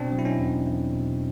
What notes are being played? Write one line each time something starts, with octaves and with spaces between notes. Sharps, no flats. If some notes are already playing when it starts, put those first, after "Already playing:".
Already playing: B2 C4 D4
F#3
E4
C#4 D#4
E2
E2
B2